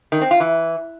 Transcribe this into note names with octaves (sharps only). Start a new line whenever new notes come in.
D#3
C4
F4
E3